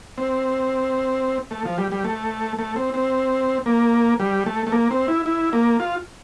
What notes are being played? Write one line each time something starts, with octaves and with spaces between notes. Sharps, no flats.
C4
A3
F3
G3
G3
A3
A3
C4
C4
A#3
G3
A3
A3
A#3
C4
E4
E4
A#3
F4